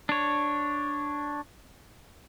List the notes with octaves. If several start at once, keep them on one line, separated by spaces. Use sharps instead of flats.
D4 C#5